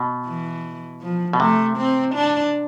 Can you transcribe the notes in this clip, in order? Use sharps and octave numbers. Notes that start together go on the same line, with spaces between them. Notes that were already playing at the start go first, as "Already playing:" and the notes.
Already playing: B2
E3
F3
B2
C3 A3
C4
D4